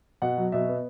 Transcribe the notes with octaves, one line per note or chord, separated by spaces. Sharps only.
B2 F#5
F#3
B2 E5
B3